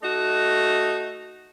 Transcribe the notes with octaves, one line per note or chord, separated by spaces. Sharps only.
A3 D#4 F#4